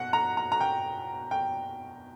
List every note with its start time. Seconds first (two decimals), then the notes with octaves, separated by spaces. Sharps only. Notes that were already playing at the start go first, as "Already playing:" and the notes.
Already playing: B2 F#5
0.13 A#5
0.37 A#5
0.52 A#5
0.61 G5
1.31 G5